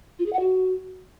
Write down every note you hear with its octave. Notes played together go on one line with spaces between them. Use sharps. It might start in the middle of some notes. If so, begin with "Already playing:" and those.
F4
G#4
F#5
F#4